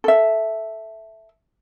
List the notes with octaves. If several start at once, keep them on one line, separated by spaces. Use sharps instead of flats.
A4 E5